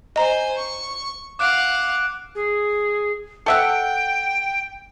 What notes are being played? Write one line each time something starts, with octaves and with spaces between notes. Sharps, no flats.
C5 D#5 G#5 A#5
C#6
F5 F#5 D6 F#6 D7
G#4
A4 E5 F#5 G5